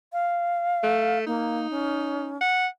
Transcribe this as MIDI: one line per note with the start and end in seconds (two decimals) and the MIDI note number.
0.13 1.19 77
0.83 1.24 57
1.26 1.67 58
1.26 2.32 63
1.71 2.38 61
2.41 2.67 78